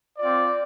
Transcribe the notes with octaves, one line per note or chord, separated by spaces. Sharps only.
C4 F4 D5